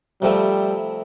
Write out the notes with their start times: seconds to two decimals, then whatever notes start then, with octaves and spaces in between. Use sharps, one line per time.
0.22 C3 F3 G3 A3 C4